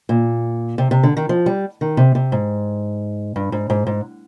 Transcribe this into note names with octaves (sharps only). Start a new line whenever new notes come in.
A#2
C3
C3
D3
D#3
F3
G3
D#3
C3
C3
G#2
G2
G#2
G#2
G#2